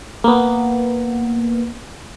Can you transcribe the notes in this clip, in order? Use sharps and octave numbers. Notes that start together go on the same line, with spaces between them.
A#3 B3